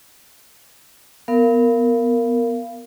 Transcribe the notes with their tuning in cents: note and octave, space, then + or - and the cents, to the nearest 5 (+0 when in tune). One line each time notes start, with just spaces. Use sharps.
B3 +0 A#4 -10 F5 -20